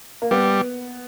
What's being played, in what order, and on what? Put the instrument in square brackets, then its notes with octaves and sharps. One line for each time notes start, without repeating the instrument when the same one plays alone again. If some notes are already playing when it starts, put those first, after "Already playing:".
[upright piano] A#3
[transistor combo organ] G3 [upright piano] B3